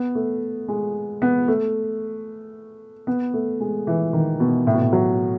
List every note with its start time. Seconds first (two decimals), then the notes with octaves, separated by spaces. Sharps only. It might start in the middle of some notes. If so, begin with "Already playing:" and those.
Already playing: B3
0.15 A3
0.68 G#3
1.22 B3
1.48 A3
3.07 B3
3.34 A3
3.60 G#3
3.87 E3
4.13 D#3
4.40 B2
4.67 A2
4.74 B2
4.82 A2
4.93 F#3